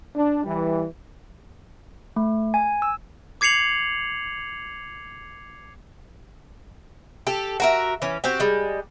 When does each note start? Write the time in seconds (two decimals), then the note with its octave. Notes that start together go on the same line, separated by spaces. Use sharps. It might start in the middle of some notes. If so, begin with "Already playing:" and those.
0.15 D4
0.44 E3 G3
2.16 A3
2.54 G#5
2.82 E6
3.41 D6 G#6 C7 C#7 F7 F#7
7.27 G4 A4
7.60 F#4 A#4 E5
8.02 E3 C#4
8.24 C4 F#4 G4
8.40 G3 G#3